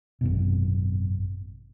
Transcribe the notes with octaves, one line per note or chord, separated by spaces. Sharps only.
G#1 F#2 B2